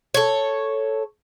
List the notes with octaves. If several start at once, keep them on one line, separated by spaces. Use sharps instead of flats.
A4 C#5